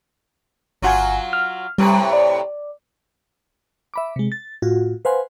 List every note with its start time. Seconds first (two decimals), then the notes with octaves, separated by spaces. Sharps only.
0.82 G1 F#3 F4 F#4 F#5 G#5
1.33 F6
1.78 A2 C3 G3 B4
2.13 D5
3.94 E5 B5 D6
4.16 C3 G#3
4.32 A6
4.62 A2 F4 F#4
5.05 B4 C5 F5 F#5 G#5 C6